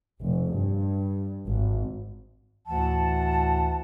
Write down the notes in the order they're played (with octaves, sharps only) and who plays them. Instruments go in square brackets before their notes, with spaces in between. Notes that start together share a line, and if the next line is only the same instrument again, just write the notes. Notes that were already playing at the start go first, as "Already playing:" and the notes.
[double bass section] F1
G2
G#1
[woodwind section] D2 A2 E3 F#5 A5